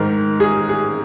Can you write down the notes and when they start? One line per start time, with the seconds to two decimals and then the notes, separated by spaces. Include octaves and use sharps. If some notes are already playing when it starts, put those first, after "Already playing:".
Already playing: G#2 D#3 A#4
0.40 G#4
0.69 G#4